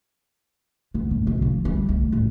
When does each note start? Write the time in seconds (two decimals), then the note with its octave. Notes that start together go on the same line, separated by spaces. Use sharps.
0.94 D3
1.11 A1
1.27 B1
1.42 F3
1.65 G3
1.89 D2
2.12 A1